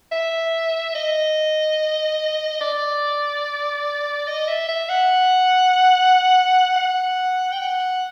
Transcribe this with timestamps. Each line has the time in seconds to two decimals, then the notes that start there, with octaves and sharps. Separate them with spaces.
0.12 E5
0.95 D#5
2.61 D5
4.27 D#5
4.48 E5
4.69 E5
4.89 F#5
6.76 F#5
7.52 G5
7.59 F#5